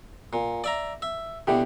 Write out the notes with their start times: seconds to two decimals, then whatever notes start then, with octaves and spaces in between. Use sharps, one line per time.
0.33 A#2
0.64 D5 E5 A#5
1.02 E5
1.47 B2 D3 E4 G4